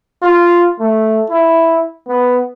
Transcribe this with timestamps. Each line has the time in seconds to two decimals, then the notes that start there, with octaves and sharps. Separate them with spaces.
0.22 F4
0.79 A3
1.29 E4
2.07 B3